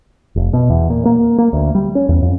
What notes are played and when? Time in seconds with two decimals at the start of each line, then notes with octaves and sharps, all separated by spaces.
0.36 F1
0.53 B2
0.70 E2
0.90 A#2
1.05 A#3
1.38 A#3
1.53 D2
1.75 G3
1.95 C#4
2.09 E2
2.22 F2